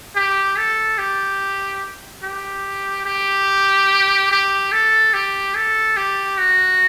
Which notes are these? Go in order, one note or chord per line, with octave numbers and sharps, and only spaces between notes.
G4
A4
G4
G4
G4
G4
A4
G4
A4
G4
F#4